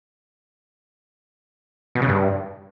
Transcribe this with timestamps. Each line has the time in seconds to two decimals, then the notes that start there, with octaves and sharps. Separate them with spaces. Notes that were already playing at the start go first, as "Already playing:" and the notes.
1.95 B2
2.02 C#3
2.08 G2